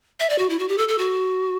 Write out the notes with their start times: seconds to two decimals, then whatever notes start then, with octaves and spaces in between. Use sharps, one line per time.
0.20 E5
0.30 D5
0.38 F#4
0.49 E4
0.59 F#4
0.68 G4
0.78 A4
0.88 A4
0.98 F#4